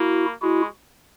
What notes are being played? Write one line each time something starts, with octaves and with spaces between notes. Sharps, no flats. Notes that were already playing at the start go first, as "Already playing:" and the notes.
Already playing: A#3 E4 F#4
G#3 E4 F#4